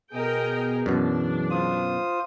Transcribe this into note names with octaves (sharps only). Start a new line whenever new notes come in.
B2 B3 G#4 A#4 D#5 G5
F#2 B2 E3 G#3 D4 D5
F4 C5 D#6